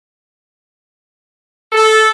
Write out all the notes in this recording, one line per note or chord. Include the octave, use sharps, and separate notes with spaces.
A4